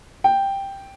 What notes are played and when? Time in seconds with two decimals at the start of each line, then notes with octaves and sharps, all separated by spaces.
0.24 G5